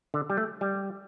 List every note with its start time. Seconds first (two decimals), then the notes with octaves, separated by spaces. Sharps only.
0.14 D3
0.30 G3
0.37 A3
0.61 G3